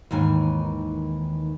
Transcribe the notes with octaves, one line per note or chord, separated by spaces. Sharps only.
D#2 G#2 D#3 E3 G#5